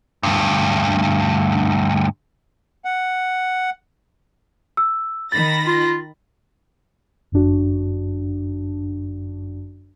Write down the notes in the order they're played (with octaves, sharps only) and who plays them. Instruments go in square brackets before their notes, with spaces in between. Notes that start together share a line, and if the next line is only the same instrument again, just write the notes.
[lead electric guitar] D2 G2
[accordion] F#5
[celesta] E6
[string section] D#3 B5 A#6 [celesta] A6
[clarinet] F4
[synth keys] G1 F#2 D4 F#4